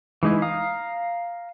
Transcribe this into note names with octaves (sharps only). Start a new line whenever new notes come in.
E3 G#3 D#4 E4
F5 A#5 D#6